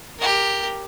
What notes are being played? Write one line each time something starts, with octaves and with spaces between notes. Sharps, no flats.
G4 A#4